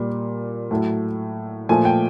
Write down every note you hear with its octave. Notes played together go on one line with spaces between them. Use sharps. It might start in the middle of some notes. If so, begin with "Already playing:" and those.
Already playing: A#2 G3
A2 F#3 A3
A#2 F3 A3 G#5
G5